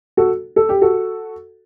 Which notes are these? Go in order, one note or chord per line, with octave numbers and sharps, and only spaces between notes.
F#4 A4
A4
G4
F#4 A4